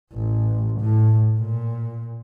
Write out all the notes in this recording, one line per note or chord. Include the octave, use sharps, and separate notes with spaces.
A1
A2
A#2